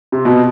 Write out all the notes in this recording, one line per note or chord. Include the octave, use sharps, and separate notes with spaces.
C3
B2